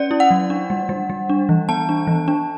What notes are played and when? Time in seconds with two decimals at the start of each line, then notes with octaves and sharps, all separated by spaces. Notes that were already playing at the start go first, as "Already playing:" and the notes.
Already playing: C#4 D5
0.11 E4
0.20 F#5
0.31 F#3
0.50 D4
0.70 G3
0.89 G3
1.10 G3
1.29 D4
1.49 E3
1.69 B3 A5
1.89 D4
2.07 E3
2.28 D4